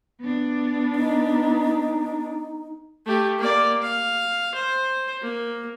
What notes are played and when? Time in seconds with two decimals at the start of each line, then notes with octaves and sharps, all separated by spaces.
0.21 B3 D4
0.95 D#4
3.06 A3 G4
3.39 A#3 D5
3.82 F5
4.55 C5
5.21 A#3